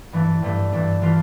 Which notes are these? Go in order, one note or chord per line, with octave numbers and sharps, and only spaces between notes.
G2 E3 A3 D4
G2 E3 A3 D4
G2 E3 A3 D4
E3 A3 D4 F4